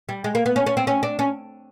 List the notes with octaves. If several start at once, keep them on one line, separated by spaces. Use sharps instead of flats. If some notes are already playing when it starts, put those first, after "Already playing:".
G3
G#3
A#3
B3
C#4
C#4
C4
C#4
D4
C#4